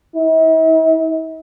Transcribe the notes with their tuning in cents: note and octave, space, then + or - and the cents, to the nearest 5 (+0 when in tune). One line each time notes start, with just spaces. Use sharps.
E4 -45